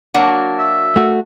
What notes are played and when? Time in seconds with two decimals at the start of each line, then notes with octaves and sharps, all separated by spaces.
0.14 F#3 A#3 D4 F#4
0.58 E5
0.96 A3 F#4